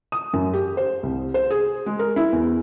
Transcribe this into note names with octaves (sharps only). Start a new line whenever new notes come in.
D#6
F#2
G4
C5
C2
C5
G#4
G#3
A#4
E4
E2